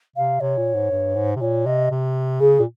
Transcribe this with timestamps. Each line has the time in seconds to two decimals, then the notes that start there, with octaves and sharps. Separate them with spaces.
0.16 C3 F5
0.40 C3 C#5
0.58 A#2
0.75 G#2
0.91 G2
1.15 G#2
1.36 C3
1.41 A#2 C#5
1.65 C3 D#5
1.91 C3
2.40 C#3 G#4
2.60 A#2